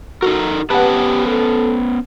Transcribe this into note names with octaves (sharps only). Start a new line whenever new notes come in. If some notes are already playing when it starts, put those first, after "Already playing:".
D#4 F#4 A4 A#4
B3 C#4 G4 B4 F#5 A5
A4